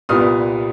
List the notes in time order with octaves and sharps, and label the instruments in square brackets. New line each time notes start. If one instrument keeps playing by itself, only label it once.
[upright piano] C2 A#2 G3 B3 D#6 F6